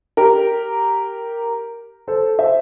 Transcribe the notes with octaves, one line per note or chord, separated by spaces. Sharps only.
G4 A#4
A4 C5
C5 E5